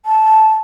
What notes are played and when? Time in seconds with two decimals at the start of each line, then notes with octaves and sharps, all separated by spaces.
0.06 A5